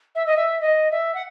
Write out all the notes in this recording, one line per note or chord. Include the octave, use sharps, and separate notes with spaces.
E5
D#5
E5
D#5
E5
F#5